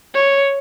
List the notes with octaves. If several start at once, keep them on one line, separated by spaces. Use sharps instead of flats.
C#5